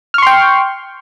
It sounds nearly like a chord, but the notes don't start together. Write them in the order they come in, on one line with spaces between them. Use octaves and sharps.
F6 C#6 C6 G5